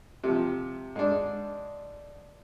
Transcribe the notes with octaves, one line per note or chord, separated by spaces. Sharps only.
C3 F3
G#2 D4